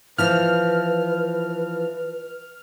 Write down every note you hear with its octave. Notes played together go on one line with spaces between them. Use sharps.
E3 F3 B4 F6